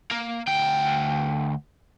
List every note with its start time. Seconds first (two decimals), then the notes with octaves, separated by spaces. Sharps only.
0.11 A#3
0.48 D2 G5